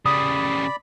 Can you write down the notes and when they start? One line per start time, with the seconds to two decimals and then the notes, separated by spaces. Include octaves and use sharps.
0.06 C#3 G3 D5 B5 D#6